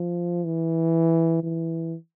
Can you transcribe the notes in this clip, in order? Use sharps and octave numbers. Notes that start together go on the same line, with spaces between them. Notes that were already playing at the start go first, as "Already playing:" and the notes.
Already playing: F3
E3
E3